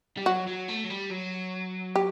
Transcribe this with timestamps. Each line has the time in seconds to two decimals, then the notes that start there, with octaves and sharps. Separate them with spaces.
0.17 G3
0.26 F#3 F#4
0.47 F#3
0.69 A3
0.84 F#3
0.90 G3
1.11 F#3
1.96 G4